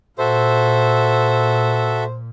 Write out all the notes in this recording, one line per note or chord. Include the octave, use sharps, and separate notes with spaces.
A#2 F#4 A4 C5 E5